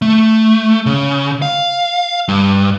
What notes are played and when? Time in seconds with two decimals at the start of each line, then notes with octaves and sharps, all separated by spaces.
0.02 A3
0.86 C#3
1.42 F5
2.28 G2